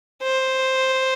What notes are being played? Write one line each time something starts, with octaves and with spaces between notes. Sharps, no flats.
C5